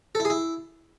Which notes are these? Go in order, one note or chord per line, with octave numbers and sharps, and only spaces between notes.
A4
E4
G#4
E4